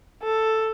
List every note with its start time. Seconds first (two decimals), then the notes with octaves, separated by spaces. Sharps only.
0.23 A4